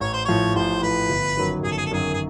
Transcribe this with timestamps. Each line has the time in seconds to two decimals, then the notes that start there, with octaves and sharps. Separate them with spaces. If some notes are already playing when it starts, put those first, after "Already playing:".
0.01 A1 C#5
0.13 C5
0.25 A2 F3 C#5
0.55 A1 C5
0.82 A2 F3 B4
1.09 G1
1.37 F#2 D#3 F#3
1.63 G1 G#4
1.71 A4
1.78 G#4
1.86 A4
1.91 F#2 D#3 F#3 G#4
2.14 G#4